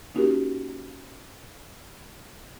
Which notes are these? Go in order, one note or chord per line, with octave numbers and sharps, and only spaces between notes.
A#3 C#4 D#4 F#4 G4 A#4